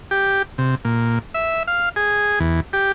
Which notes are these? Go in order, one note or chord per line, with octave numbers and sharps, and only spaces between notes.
G4
C3
A#2
E5
F5
G#4
E2
G4